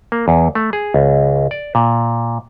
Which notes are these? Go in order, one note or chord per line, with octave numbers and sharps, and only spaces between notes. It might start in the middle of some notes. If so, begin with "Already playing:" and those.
A#3
E2
A3
G#4
C#2
D5
A#2